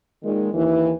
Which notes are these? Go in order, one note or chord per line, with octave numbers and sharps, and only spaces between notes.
A#2 D#3 G#3
D#2 E3